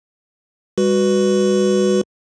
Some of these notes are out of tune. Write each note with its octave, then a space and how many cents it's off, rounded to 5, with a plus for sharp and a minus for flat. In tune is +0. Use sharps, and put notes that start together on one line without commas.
G3 +35 F#4 +0 B4 +0